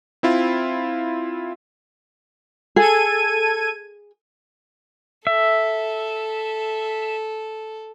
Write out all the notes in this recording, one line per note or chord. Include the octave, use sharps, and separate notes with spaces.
C4 E4 F4
G#4 A4 G#6 D#7
A4 E5